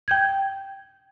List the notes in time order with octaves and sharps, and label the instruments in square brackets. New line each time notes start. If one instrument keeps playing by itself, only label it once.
[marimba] G5 G6 G#6